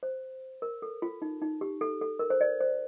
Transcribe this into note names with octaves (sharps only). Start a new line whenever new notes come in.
C5
A#4
A4
F4
D#4
D#4
G4
A4
A4
A#4
C5
D5
C5